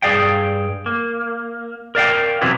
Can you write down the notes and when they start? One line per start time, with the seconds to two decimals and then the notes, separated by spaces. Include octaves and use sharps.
0.02 G2 G#4 D5 F5 G5
0.86 A#3
1.95 A#4 D5 F5 G5
2.41 C3 E3 F#3 B3